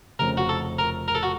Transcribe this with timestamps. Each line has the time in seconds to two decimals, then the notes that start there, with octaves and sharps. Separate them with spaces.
0.19 F1 F2 C#3 A#4
0.37 F#4
0.49 A4
0.79 A#4
1.08 A#4
1.15 A4
1.23 F#4